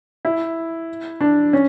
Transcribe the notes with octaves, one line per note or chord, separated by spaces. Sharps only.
E4
D4
C#4